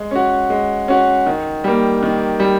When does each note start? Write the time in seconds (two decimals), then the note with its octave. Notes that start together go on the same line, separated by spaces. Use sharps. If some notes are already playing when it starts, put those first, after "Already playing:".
Already playing: G#3
0.11 C#4 F#4
0.50 G#3
0.88 C#4 F#4
1.26 D#3
1.64 G3 A#3
2.03 D#3
2.40 G3